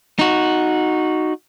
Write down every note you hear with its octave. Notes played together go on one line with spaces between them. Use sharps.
D#4 F#4